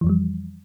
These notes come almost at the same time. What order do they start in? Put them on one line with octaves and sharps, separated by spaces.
E3 F2 F3 G3